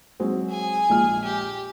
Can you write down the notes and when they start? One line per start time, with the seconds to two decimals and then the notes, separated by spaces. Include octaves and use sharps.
0.20 F#3 G#3 C4
0.49 G#4 G#5
0.89 A#1 G#3 F6
1.24 G4